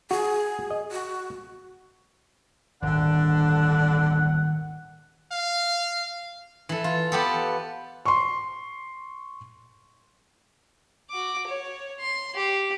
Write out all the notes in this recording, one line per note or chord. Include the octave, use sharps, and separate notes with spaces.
F#4 G#4
D#5
F#4
D#1 G#1 D3 D#3 D4 F#5
F5
E3 A4
F4
B3 G4 A4
C6 C#6
F#4 D6
C#5
C6
G4